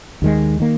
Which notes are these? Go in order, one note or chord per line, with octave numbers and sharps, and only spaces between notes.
D#2 D#3 G#3
D#3 A#3